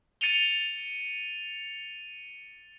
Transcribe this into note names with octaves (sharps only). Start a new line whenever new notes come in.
A6 C#7 D#7 F7 G7